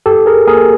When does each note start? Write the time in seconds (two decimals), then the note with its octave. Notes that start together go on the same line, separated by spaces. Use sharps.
0.06 G2 G4 A4
0.26 G#4 A#4
0.47 A#3 G#4 A#4